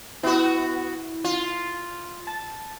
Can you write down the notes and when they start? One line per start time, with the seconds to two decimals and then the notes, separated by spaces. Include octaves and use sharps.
0.23 B3 E4 F#4
1.24 F4
2.27 A5 A6